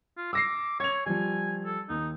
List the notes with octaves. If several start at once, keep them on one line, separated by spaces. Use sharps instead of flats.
F4
D6 E6 A#6 C7
C#5 G#6 F7
F3 G3 G#5
A4
D#2 D#4